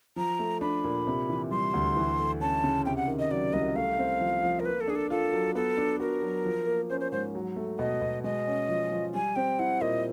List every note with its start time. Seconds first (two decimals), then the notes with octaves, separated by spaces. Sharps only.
0.16 F3 A#5
0.39 A3
0.61 D4 B5
0.84 A#2
1.07 C3
1.29 E3
1.51 G3 C6
1.74 D2
1.96 E3
2.19 A3
2.41 C#4 A5
2.64 C#3
2.86 C3 G5
2.97 F#5
3.08 D#3
3.19 D#5
3.30 F#3 D5
3.53 C2 D#5
3.76 A3 F5
3.98 C4
4.21 F3
4.43 F3
4.60 A#4
4.65 A#3 B4
4.81 A4
4.88 D4 G#4
4.96 A4
5.10 F4 A4
5.33 F#3
5.55 B3 A4
5.78 D4
6.00 F#4 A#4
6.22 F#3
6.45 F3
6.67 A#3
6.90 C#4 C5
7.00 C5
7.12 G#2 C5
7.35 F#3
7.56 A3
7.79 B2 D#5
8.01 B2
8.24 G#3 D#5
8.47 C#4
8.69 F3
8.91 F3
9.14 G3 G#5
9.36 C4 G5
9.59 E4 F#5
9.81 A#2 D#5